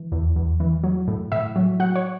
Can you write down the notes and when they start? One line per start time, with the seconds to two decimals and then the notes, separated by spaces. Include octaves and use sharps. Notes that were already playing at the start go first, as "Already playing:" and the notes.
Already playing: E3
0.12 E2
0.36 E2
0.60 E3
0.84 F#3
1.08 A2
1.32 A2 E5
1.56 F#3
1.80 F#3 F#5
1.96 C#5